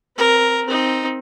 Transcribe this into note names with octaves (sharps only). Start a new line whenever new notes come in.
C4 A#4
C4 D#4